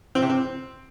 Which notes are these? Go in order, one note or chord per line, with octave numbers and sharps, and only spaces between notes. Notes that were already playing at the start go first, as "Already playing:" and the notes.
C4
C3
C4